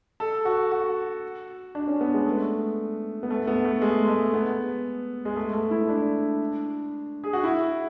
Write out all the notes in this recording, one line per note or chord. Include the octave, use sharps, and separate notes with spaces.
A4
F#4
F#4
D4
C#4
B3
G#3
A3
B3
A3
B3
A3
G#3
G#3
A3
B3
G#3
A3
A3
E4
D4
G#4
F#4
E4